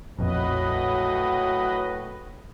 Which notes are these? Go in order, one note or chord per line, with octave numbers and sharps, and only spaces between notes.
A#1 F2 A2 F#3 F#4 B4 D#5